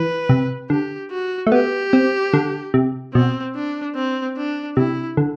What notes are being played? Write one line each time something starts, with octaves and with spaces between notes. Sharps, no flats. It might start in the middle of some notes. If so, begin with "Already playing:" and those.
Already playing: E3 B4
C3
D3 G4
F#4
A3
B3 G4
C4
D3
C3
B2 C4
D4
C4
D4
C3 E4
D3